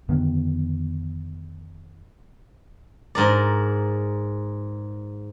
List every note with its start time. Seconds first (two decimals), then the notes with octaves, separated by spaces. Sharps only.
0.08 F2 D3 D#3 B3
3.15 G#2 A#4 D5